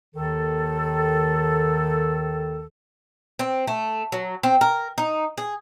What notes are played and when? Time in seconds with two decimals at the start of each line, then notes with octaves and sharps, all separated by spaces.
0.15 D#2 D#3 A4
3.39 C4
3.67 A3
4.12 F#3
4.43 C4
4.61 A#4
4.98 D#4
5.38 G#4